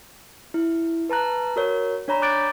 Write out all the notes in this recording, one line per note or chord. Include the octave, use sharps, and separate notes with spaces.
E4
B4 A5 A#5 F#6
F#4 A#4 C#5
D4 C#5 A#5 B5
D6 F#6 G6 A6 D7